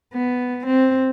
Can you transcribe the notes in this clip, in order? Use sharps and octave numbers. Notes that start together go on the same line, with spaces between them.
B3
C4